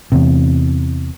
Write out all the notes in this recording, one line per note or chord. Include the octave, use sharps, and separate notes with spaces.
E2 C3